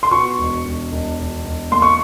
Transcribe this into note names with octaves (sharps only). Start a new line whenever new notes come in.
C6
B2 C#6
E1
E1
E1
E1
E1
A#3 C6
C#6